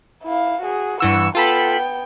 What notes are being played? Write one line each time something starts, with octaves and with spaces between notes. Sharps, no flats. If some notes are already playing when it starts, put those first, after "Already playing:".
E4 F5
F#4 G#4
G2 E3 F#5 C#6 E6
B3 F4 A4 G5 B5